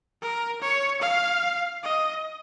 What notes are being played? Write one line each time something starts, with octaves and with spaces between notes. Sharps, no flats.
A#4
C#5
F5
D#5